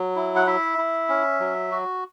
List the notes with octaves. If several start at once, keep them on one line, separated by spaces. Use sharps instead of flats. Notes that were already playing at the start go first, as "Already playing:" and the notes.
Already playing: F#3
E4
F#5
E4 E5
E4
C#4
F#3
F#4